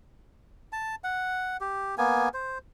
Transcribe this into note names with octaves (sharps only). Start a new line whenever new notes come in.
A5
F#5
G4
A#3 B3 G#5
C5